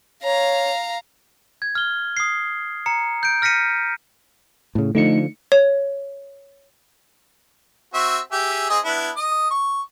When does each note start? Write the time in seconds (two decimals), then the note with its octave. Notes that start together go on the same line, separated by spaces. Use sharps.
0.24 C#5 F5 A#5
1.62 G#6
1.75 F6 G7
2.17 D#6 C7
2.86 A#5 C#7
3.23 G6 D7
3.42 F6 A#6 B6 C#7 D#7
4.75 A2 C#3
4.95 D3 F3 A3 D#4 C#7
5.52 C#5
7.94 C4 F#4 E5
8.32 G4 G#4 E5
8.70 C4 G#4 D#5
8.85 B3 D4 E4
9.16 D#5 D#6
9.50 C#6